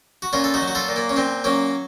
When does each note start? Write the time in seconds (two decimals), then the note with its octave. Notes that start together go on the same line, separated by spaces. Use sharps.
0.22 F#4
0.33 A#2 C#4 F4
0.44 A4
0.54 D#4 F#4
0.61 F#3
0.68 F#4
0.75 F4 A4
0.88 A#2
0.96 A#3
1.09 C#4
1.16 A#2 C4
1.44 F#3 A#3 C#4